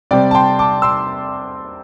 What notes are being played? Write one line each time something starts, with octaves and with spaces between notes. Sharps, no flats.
C3 G3 C4 D5 G5
A5
G5 C6
A5 D6
C6 E6